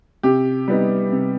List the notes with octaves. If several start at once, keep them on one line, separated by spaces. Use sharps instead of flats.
C3 G4
G3 B3 D#4
C3